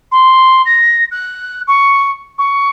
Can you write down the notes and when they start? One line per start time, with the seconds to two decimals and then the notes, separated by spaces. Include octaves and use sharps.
0.11 C6
0.66 A#6
1.11 F#6
1.67 C#6
2.38 C#6